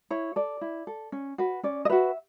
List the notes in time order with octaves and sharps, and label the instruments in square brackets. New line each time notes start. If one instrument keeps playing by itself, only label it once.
[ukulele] E4 C#5
A4 D5
E4
A4
C#4
F#4 B4
C#4 D5
D#5
F#4 B4 E5